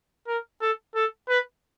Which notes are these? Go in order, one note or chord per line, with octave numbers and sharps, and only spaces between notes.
A#4
A4
A4
B4